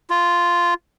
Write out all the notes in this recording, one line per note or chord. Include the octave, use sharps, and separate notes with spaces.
F4